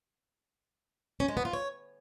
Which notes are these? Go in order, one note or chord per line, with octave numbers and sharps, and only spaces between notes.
C#4
G#3
B3
F4
C#5